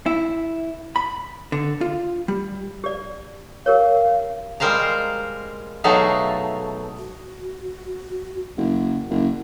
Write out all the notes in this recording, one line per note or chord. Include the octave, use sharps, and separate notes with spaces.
E4
B5
D3
F4
G3
G4 D5
G4 A#4 C#5 F5
G3 G#3 A#4 C5 F5 A#5
B2 F#3 A3 D#4 G#4 F5
F#4
F#1
F#1